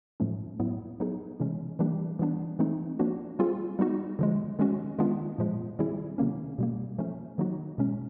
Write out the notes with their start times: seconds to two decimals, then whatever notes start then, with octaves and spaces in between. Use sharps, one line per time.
0.20 A2 F3 A3 C#4
0.60 A2 F#3 B3 E4
1.00 F#3 B3 D#4 G#4
1.40 C3 E3 G#3 C#4
1.79 E3 G3 A#3 D4 G4
2.19 E3 G3 B3 D4
2.59 E3 A3 C4 D#4
2.99 F3 A#3 D4 F#4
3.39 G3 C4 F4 G#4
3.79 G3 B3 D#4 F#4
4.19 D3 F3 G#3
4.59 D#3 G#3 C#4 F#4
4.98 D#3 G#3 B3 D4 F4
5.38 A#2 F3 G#3
5.79 D#3 G3 C4 E4 G#4
6.18 C3 D#3 F#3 A#3 C#4
6.58 B2 G3 A#3
6.98 F3 A3 C#4
7.38 D#3 F#3 A#3 D#4 F#4
7.78 B2 G#3 C#4